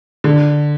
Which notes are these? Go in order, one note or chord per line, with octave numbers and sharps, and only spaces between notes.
D3